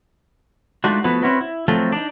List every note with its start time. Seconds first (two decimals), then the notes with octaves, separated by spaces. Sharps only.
0.84 G#3 A3 D4 D#4 F4 F#4
1.04 F3 A3 B3 E4 F#4 B4
1.23 C4 C#4 E4 F#4 B4
1.41 E4
1.68 F3 F#3 A3 C4 F4 A4
1.92 D4 D#4